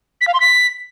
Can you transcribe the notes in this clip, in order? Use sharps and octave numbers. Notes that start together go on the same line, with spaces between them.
B6
F5
C6
B6